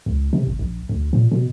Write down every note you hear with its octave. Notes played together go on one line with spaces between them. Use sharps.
C#2
C3
G#1
A#1
D2
A#2
B2